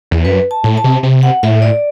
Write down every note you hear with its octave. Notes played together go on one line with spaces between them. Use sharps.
E2
F#2 B4
A5
A2
A5
C3
C3
F#5
A2 E5
D5